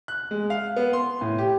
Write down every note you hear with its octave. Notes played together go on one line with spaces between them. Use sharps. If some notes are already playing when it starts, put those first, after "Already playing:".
F#6
G#3
F5
B3
C6
A2
G4